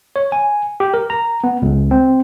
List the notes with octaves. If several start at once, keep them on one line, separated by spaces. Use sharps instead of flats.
C#5
G#5
G4
A#4
A#5
B3
C#2
C4